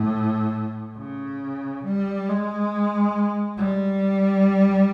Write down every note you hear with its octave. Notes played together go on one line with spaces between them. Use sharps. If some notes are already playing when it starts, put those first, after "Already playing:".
Already playing: A2
C#3
G3
G#3
G3